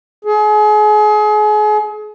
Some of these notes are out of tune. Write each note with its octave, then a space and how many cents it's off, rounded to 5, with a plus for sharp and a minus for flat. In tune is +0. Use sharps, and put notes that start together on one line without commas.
G#4 +35